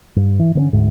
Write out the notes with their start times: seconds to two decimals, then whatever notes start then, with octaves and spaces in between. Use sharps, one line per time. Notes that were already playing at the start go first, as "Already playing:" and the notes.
0.16 G2
0.39 E3
0.55 D3 B3 C#4
0.73 D2 G#2